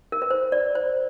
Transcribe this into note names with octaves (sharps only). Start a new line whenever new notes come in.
A#4
B4
C5
D5
C5